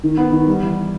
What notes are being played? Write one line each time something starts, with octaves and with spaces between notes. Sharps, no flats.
D#3
B3
D#3
G3
E3